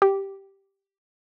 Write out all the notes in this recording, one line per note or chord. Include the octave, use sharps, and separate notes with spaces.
G4